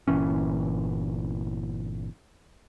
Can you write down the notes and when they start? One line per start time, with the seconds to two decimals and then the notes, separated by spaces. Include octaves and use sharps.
0.08 G1 A#2 E3 C#4